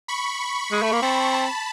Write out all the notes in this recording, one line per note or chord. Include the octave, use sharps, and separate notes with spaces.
B5 C#6
G#3
A3
A#3
C4 A5 B5
A5 B5